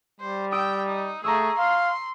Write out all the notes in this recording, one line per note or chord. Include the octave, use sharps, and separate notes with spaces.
G3 C5
G5 D#6 E6 D7
D#4
A3 G#4 A#5 C#6 E6
F5 C6